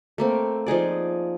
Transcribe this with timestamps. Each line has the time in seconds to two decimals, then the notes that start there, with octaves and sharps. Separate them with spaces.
0.18 A3 A#3 C4
0.66 F3 D#4 G#4 D5